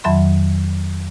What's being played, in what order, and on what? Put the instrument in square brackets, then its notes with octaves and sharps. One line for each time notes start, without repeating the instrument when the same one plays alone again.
[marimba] F2 D#3 F#3 E5 B5 C6